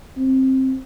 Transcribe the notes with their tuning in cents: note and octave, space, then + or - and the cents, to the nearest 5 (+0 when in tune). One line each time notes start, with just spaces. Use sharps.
C4 +15